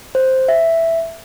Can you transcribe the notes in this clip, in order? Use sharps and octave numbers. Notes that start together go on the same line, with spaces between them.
C5
E5